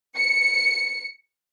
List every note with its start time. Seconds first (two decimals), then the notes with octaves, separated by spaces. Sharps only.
0.16 C#7